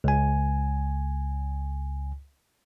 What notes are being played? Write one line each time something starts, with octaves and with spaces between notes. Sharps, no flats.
C#2 G#5